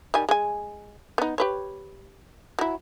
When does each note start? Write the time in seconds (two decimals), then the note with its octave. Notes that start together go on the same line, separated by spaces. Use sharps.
0.14 D#3 G3 G#5
0.29 G#3 G#5
1.18 B3 D#4
1.38 G4 B4 C#5
2.59 F#3 E4